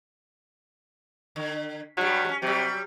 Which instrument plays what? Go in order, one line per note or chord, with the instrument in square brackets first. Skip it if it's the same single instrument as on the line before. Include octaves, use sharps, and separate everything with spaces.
[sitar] D3
[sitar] G2 G3 [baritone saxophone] F#3
[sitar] G#3 C#4
[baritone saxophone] C3 [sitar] F#3 G3